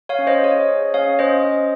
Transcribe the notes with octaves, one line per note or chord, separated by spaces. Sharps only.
C#5 F5
C#4
C5 D#5
G#4 C#5
G#4
C#4 C#5 F5
C#4 C5 D#5
C#4